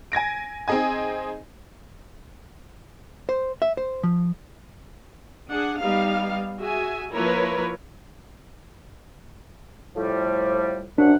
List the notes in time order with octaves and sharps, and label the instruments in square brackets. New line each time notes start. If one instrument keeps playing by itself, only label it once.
[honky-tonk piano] G#5 G#6 A#6 D7
C4 D#4 G#4 D#5 G#5
[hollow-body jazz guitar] C5
E5
C5
F3
[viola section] D4 G#4 F#5
G3 B3 D#4 F5
F#4 G#4 E5 G#5
F3 A#3 E4 A#4 B4 C#5
[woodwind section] A2 F3 G3
[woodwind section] F#2 F3 F#5 [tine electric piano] D4